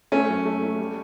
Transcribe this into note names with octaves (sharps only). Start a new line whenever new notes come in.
A3 C#4
F#2
A3
A3
G3